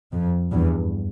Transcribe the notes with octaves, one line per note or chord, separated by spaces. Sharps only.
F2
E2 G2